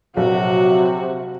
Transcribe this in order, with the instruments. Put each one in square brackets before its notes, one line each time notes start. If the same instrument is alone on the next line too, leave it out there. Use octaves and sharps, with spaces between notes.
[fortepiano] A#1 [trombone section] C3 [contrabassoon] F#3 [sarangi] F#4